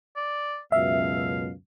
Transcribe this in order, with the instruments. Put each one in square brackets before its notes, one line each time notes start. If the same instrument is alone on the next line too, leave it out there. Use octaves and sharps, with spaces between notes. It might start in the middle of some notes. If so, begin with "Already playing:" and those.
[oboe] D5
[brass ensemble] C#2 F#2 B2 [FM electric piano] E5 [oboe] F5